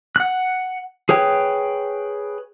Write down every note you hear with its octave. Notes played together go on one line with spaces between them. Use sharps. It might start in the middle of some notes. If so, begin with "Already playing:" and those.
F#5 F#6
G#4 B4 C#5 G5